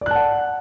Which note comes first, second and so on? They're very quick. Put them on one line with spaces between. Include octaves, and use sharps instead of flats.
D5 F#6 A5 F#5